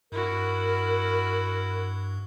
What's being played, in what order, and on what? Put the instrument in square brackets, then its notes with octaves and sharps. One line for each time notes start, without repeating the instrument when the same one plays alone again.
[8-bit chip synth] G2 [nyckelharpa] E4 F#4 [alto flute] A#4